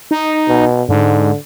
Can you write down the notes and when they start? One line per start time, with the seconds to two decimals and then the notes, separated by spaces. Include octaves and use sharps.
0.11 D#4
0.48 B2
0.89 G#2 D3